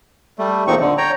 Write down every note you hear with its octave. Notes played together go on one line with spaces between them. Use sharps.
G3 A3
E2 A#2 F3 C4 D#4 C#6
D3
C#5 G5 A#5